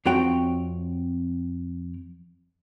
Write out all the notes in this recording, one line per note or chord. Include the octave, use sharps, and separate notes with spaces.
F2 C4 F#4 C#5 G5